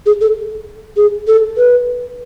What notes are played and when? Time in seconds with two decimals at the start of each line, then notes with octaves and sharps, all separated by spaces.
0.06 G#4
0.21 A4
0.97 G#4
1.27 A4
1.57 B4